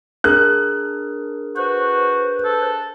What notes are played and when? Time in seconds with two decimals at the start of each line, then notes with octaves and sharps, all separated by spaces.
0.24 D4 G#4 A#4 F#6
1.56 F#4 B4 C5
2.44 A4